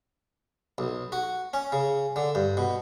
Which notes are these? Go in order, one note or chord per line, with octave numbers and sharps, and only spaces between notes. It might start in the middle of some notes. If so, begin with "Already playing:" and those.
B1
F#4
C#4
C#3
D3
G2
B2